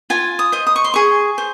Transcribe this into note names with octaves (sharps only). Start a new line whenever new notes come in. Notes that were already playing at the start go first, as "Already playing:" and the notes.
F4 G#5
D#6
C5 D#5
D#6
C#6
C6
G#4 C#6
C5